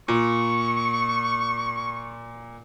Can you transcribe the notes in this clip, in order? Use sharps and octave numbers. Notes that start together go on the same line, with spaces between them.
A#2 C#6